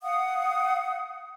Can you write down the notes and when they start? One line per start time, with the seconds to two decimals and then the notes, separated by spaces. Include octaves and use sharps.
0.03 F5 F#5 D#6